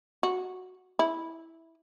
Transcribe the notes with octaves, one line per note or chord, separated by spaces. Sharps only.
F#4
E4